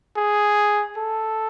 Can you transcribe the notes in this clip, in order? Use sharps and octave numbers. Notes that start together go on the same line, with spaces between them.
G#4
A4